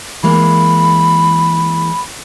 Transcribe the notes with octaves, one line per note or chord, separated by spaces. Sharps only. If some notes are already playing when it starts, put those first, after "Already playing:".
E3 G#3 A#3 B5